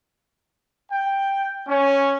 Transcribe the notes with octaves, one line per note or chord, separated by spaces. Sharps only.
G5
C#4